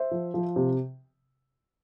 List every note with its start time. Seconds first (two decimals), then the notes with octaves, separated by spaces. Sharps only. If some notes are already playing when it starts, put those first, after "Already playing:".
Already playing: C5 E5
0.11 F3
0.34 F3
0.56 C3